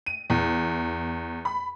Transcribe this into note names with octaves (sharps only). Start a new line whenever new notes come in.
D#7
E2
B5